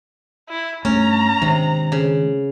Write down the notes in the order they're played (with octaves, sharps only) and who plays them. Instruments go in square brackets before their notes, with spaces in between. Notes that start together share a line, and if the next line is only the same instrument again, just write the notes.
[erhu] E4
[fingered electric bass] G2 A3 [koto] C#4 [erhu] A#5
[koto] C3 [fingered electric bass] D#3 G#3 D4
[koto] C#3